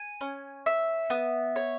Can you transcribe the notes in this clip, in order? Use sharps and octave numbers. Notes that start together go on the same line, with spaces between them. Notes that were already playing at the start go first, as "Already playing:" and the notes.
Already playing: G#5
C#4
E5
B3
C#5